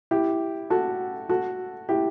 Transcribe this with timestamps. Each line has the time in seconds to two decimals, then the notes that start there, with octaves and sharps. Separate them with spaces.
0.11 E4 G4
0.70 F#4 A4
1.29 F#4 A4
1.89 E4 G4